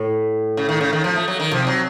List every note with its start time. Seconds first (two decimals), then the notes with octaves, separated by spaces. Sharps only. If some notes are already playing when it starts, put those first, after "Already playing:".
Already playing: A2
0.57 C#3
0.69 D#3
0.81 C#3
0.93 D#3
1.04 F3
1.16 A3
1.28 F#3
1.39 D#3
1.51 C3 F3
1.67 F#3